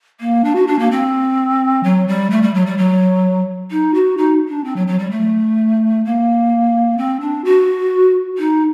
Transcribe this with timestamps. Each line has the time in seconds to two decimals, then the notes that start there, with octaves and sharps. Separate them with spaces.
0.20 A#3
0.44 D4
0.55 F#4
0.67 D4
0.79 A#3
0.91 C4
1.84 F#3
2.08 G3
2.30 A3
2.42 G3
2.54 F#3
2.66 G3
2.78 F#3
3.71 D#4
3.94 F#4
4.17 D#4
4.49 D4
4.64 C4
4.76 F#3
4.87 F#3
4.99 G3
5.11 A3
6.05 A#3
6.98 C4
7.21 D4
7.45 F#4
8.38 D#4